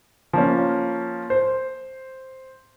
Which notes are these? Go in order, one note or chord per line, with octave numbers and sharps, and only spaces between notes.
F3 A#3 C#4
C5